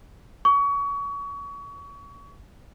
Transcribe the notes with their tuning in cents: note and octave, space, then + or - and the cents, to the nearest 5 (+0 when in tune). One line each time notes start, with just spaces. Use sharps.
C#6 +30